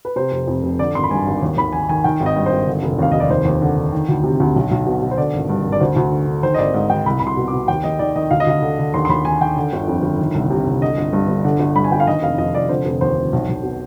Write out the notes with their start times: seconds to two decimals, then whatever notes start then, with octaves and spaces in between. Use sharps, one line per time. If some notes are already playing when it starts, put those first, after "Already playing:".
0.05 B4
0.16 C3 C5
0.32 F1
0.47 F2
0.63 F1
0.79 D3 D5
0.95 G#1 C6
1.03 B5
1.11 G2 G#5
1.26 G#1
1.42 D#2
1.57 D#2 B5
1.73 D#3 G#5
1.89 D#3 G#5
2.04 D#3 G5
2.20 G#1
2.26 D#5
2.36 G2
2.46 C5
2.51 G#1
2.67 D3
2.83 F1
2.99 D#2 F5
3.12 F1 D#5
3.20 D5
3.30 D#2 C5
3.45 D#2
3.62 D3
3.77 D3
3.93 D#3
4.09 D2
4.24 C3
4.40 D2
4.56 B1
4.71 B1
4.86 B2
5.02 B2
5.11 C5
5.18 D3 D5
5.34 G#1
5.49 G2
5.65 G#1
5.72 D5
5.80 D2 C5
5.96 D2
6.12 D3
6.27 D3
6.43 D#3 C5
6.54 D#5
6.58 G#1 D5
6.74 G#2 D#5
6.90 G#1 G5
7.06 C2 B5
7.20 C2 B5
7.27 C6
7.37 B2
7.48 D6
7.53 B2
7.68 D#2 G5
7.84 D#2 D#5
7.99 D#3 D5
8.16 D#3 D#5
8.31 D2 F5
8.40 D#5
8.47 D2 F5
8.62 D3
8.79 D3
8.94 D#2 C6
9.05 C6
9.09 D#2 B5
9.24 D#3 G#5
9.41 D#3 G5
9.56 D3
9.73 G1
9.88 F2
10.03 G1
10.19 D#3
10.35 C2
10.50 C3
10.67 C2
10.82 D3 D#5
10.98 G1
11.13 G2
11.28 G1
11.44 D3
11.60 G1
11.75 G2 B5
11.84 G#5
11.92 G1 G5
12.00 F5
12.07 D#3 D#5
12.22 F1 F5
12.38 F2 D#5
12.54 F1 D5
12.69 D3 C5
12.85 F1
13.01 D#2 C5
13.17 F1
13.33 B1
13.48 B1
13.63 B2